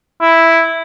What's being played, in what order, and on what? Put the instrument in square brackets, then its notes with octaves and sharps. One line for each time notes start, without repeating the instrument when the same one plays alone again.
[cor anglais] E4